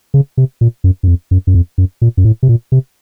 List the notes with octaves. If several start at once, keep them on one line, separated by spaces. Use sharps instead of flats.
C#3
C3
A#2
F#2
F#2
F2
F#2
F#2
F2
F#2
A#2
F#2
A2
C3
A#2
C3